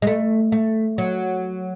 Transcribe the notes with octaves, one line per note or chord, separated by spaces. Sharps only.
G#3
A3
A3
F#3